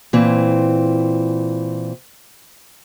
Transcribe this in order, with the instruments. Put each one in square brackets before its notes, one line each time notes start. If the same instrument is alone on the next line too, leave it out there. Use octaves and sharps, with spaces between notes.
[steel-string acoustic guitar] A#2 E3 C4